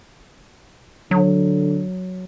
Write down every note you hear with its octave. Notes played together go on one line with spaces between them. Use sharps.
D3 F#3